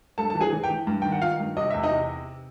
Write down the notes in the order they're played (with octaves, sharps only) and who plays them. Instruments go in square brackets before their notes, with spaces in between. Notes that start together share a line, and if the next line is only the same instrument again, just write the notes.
[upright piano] G2 A4 A5
E3 A5
G#4 G#5
E3
G4 G5
E3
G2
D#3 G5
F#5
D#3 F4 F5
G2
C3 D#5
E2 E5
D#4 D#5
C3